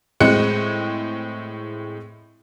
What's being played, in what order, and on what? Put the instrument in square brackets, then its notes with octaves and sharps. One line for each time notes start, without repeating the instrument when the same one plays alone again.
[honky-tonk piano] A2 G#3 C4 F#6 C#7